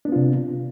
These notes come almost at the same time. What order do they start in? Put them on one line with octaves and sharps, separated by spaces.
D4 B3 F4 C3